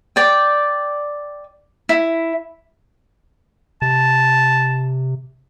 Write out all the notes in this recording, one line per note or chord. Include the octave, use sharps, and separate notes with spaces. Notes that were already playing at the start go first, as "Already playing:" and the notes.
D5 G5
E4
C3 A5